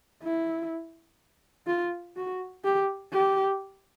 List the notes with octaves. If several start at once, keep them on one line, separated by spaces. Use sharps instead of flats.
E4
F4
F#4
G4
G4